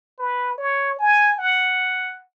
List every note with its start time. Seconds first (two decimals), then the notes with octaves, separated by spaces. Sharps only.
0.19 B4
0.58 C#5
0.99 G#5
1.39 F#5